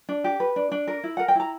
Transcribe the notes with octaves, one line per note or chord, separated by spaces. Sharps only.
D4
G4
B4
D4
D4
A#4
E4
A#4 F#5
G5
E4 A#5